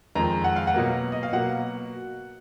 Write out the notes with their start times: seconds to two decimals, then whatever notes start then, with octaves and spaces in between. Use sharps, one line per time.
0.15 F2 D#3 G#3 A#5
0.44 F#5
0.56 F5
0.67 F#5
0.74 B2 F#3 A#3
1.12 D#5
1.23 F5
1.33 B2 F#3 A#3 F#5